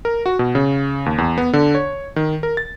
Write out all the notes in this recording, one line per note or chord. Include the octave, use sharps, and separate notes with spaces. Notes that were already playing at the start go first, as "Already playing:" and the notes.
A#4
F#4
B2
C#3
D#2
E2
B3
D3
C#5
D#3
A#4
A6